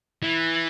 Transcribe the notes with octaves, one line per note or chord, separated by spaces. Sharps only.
E3